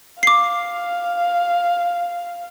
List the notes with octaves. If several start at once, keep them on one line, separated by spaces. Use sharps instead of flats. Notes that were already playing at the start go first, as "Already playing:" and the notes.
F5 D6 C7